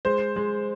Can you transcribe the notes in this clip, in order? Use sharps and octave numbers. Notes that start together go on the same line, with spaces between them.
G#3 C5
G#3